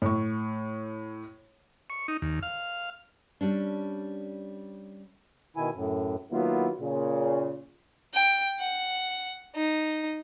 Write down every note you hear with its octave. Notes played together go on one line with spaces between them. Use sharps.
A2 C#6
C#6
D#4
D#2
F5
G3 C#4 D4
B2 D#3 E4 G#5
F#2 A2
D#3 F#3 A#3 B3 E4 F4
A#2 C#3
G5
F#5
D#4